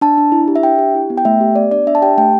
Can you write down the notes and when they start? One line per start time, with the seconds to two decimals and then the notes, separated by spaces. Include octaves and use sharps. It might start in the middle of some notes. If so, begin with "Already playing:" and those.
0.01 D4 A5
0.18 D4
0.32 E4
0.48 G4
0.56 E5
0.63 D4 G5
0.79 G4
0.94 E4
1.10 B3
1.18 G5
1.25 A3 E5
1.41 G4
1.55 B3 D5
1.71 D4 D5
1.87 D4 E5
1.95 A5
2.02 G4 G5
2.18 A3 G5